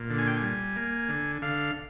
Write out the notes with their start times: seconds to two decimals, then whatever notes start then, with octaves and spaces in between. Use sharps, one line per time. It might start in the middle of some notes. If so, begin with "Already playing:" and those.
Already playing: A#2
0.10 D3
0.18 G#5
0.27 G5
0.37 G#5
0.42 G3
0.76 A#3
1.09 D3
1.42 D3 F5